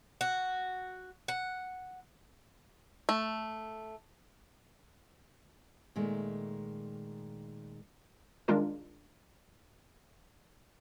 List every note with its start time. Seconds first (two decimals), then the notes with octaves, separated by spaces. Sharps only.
0.21 F#4
1.28 F#5
3.09 A3
5.96 A#2 D#3 G#3 A3
8.48 D#3 G3 G#3 D4 F4 A#4